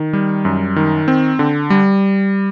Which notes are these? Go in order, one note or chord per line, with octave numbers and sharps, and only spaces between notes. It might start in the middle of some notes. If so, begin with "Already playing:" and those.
Already playing: D#3
G3
F#2
D#3
C4
D3
G3